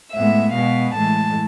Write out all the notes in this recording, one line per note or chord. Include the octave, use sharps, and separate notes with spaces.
A2 G#3 B3 E5
B2 G#3 B3 F5
A2 E3 G#3 A5